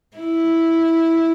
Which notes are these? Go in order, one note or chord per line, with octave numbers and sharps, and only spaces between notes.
E4